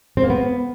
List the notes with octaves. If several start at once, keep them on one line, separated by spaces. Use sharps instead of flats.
C4
A#3
B3